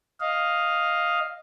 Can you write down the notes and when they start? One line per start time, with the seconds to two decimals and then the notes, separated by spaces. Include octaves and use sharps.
0.20 D#5 F5